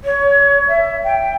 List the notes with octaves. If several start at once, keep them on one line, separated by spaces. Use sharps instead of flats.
C#5
E5
G5